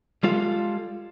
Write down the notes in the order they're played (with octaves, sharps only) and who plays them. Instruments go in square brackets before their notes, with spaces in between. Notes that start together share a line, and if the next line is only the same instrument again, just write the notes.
[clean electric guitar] G3 G#3 F4 A4 F5